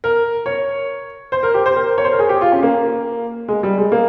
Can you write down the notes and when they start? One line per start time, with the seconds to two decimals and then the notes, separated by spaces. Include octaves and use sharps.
0.04 A#4
0.46 C#5
1.32 C5
1.43 A#4
1.54 G4
1.66 C5
1.75 A#4
1.98 C#5
2.04 C5
2.12 A#4
2.19 G#4
2.29 G4
2.41 F4
2.52 C#4
2.63 A#3
3.48 G#3
3.63 G3
3.78 G#3
3.92 A#3